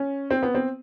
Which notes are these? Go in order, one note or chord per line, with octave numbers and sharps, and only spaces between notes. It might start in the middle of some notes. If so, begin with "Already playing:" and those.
Already playing: C#4
C4
B3
C4